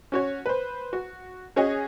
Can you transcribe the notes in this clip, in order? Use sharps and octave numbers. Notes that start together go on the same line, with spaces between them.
C#4 F#4 C#5
B4 C5
F#4
C#4 F#4 G#4 C#5 D#5